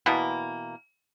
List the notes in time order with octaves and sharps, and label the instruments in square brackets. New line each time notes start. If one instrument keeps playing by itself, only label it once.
[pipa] B2 E3 A#3